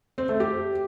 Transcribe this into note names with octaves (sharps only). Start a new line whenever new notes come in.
C4
A3
G4